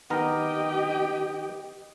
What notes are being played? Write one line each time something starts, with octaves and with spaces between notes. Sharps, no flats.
D#3 B3 G4 A#4 D#5